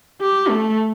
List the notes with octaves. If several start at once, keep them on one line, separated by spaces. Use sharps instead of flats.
G4
A3